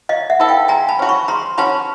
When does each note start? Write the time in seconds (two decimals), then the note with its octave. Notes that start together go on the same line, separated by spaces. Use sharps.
0.09 F#3 D#5 F5
0.30 E5 F#5
0.40 B3 E4 A4
0.49 F5 G5
0.68 G#3 G#5 A#5
0.89 A5 B5
0.99 C#4 F#4
1.09 B5 C#6
1.28 G#3 A#5 C6
1.58 C#4 F#4 A5 B5